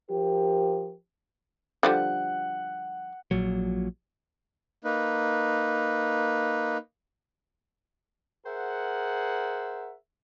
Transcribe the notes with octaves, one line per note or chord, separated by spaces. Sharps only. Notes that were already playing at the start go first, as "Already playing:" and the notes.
F3 G4 A#4
D3 F3 G3 F#5
A#1 A#2 F#3
A#3 D#4 B4
G#4 A#4 C5 E5 F#5